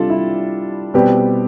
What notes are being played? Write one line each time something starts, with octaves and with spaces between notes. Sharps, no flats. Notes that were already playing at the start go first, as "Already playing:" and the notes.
Already playing: C3 G3 D4 F4 A4
E4
B2 G3 C4 G4 B4